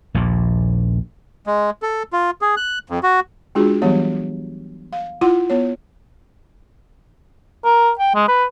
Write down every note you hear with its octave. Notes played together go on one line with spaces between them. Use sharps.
A#1 D#2 A#2
G#3
A4
F4
G#4
F#6
F2
F#4
G#3 D4 F4 F#4 G#4
E3 F#3 G3 B3 G4 C#5
F5
E4 F4 F#5 C6
B3 C#5
A#4
G5
G#3
B4